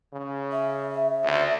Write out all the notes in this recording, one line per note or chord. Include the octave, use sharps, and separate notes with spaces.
C#3
E5
D2